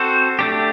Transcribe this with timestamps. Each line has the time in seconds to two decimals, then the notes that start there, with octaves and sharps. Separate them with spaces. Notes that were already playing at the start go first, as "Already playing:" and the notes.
Already playing: C4 F#4 A4 C5
0.39 A3 D4 G4